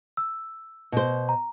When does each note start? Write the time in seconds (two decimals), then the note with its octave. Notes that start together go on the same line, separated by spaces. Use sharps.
0.17 E6
0.92 B2 C5
1.29 A#5